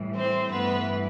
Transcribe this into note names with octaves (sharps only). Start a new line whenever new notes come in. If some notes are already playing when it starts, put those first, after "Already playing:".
Already playing: A2 E3 G3
C4 C5
G2 E3 A3 B3 B4